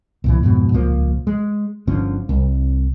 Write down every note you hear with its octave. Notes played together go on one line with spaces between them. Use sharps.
C2 A#2 E3
F2 G#2 B2
D#1 C#2 F3 A#3
G#3
G1 D3 F3 C#4
C2